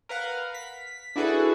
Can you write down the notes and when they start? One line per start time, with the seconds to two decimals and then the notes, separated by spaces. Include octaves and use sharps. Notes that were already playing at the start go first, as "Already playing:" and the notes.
0.09 A#4 B4 F5 F#5
0.54 B6
1.16 D4 E4 F#4 G#4 A4 B4